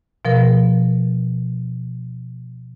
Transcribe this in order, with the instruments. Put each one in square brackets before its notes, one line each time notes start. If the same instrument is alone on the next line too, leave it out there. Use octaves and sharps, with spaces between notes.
[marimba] B2 F3 A#4